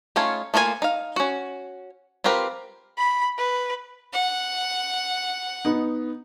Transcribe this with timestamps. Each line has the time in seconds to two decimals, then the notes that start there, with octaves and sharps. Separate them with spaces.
0.16 A3 C#4 D#4 F4 C#5
0.54 A3 A#3 F4 F#4 G#5
0.82 D#4 F5
1.16 C#4 F#4
2.24 C4 F4 G4 A#4 B4
2.98 B5
3.38 B4
4.13 F#5
5.65 B3 D#4